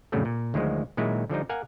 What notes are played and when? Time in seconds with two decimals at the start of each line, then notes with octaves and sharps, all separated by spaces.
0.12 F2 A2 C#3 F#3 G3 A3
0.25 A#2
0.54 D2 D#3 F3 F#3 G#3
0.97 A#2 D#3 F#3 G#3 E4
1.30 D3 F3 G3 D#4
1.49 A#4 F5 F#5 G#5